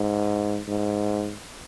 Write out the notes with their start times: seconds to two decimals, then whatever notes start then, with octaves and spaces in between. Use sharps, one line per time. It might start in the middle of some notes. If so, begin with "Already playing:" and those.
Already playing: G#2
0.68 G#2